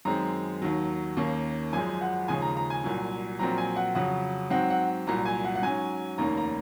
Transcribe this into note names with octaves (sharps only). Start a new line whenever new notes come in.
F#2 D#3 G#3 C4 A#5
D#2 D#3 F#3
D#2 D#3 A#3 C#4
G#1 F#2 F3 G#3 G#5
F#5
D#2 C#3 F3 G#3 G#5
A#5
A#5
G#5
C2 A#2 F#3
A#1 A#2 F#3 C4 A#5
G#5
F#5
F2 C#3 F#3 F#5
G#2 F#3 C4 F#5
F#5
C2 A#2 F#3 A#5
G#5
F#5
F#5
G#2 F#3 C#4 G#5
F1 D#2 D#3 A#3 C#4 A#5
A#5